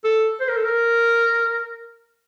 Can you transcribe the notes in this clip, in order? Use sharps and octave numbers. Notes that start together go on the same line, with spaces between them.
A4
C5
A#4
A4
A#4